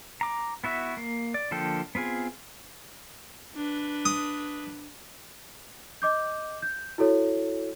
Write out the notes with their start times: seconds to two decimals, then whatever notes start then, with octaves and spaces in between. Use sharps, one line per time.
0.21 A#5 D6
0.64 B3 E4 F#4 E5
0.97 A#3
1.34 D5
1.51 D3 F3 A#3 A4 G5
1.95 B3 C4 F4 G#4
3.55 D4 B4
4.05 D#6
6.02 D#5 D6 G6
6.62 G6
6.98 E4 F#4 A4 C#5